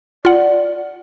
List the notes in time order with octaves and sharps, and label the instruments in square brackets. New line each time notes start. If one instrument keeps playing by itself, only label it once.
[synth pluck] F4 F#5 [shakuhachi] D5